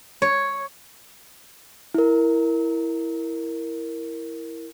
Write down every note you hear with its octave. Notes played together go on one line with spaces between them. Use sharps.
C#5
E4 A#4